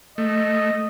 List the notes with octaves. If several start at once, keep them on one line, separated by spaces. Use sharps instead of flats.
A3 D#5